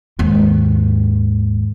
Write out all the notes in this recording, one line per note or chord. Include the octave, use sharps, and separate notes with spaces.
D#2 G#2